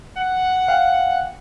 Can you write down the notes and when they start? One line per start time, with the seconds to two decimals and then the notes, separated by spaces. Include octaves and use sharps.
0.17 F#5
0.68 F5 G5